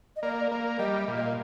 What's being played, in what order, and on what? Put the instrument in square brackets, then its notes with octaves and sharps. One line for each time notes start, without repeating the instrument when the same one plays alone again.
[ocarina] D#5
[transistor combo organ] A#3 [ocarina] D5
[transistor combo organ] A#3
[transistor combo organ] G3 [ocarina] D#5
[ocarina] E5
[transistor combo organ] A#2
[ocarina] D#5